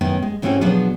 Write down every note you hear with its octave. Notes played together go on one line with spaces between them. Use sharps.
F#2 A2 D#3 B3
G#3
G#2 E3 A3 C4 C#4 F#4
B2 F3 F#3 B3 D4 G#4